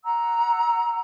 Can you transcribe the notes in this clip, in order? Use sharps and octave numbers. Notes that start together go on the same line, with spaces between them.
F#5 A#5 E6